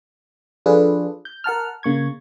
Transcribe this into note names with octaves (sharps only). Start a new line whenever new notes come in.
F3 D4 F4 G#4 A4 B4
G6
A#4 F#5 A5 F6
C#3 A#3 C#6 G#6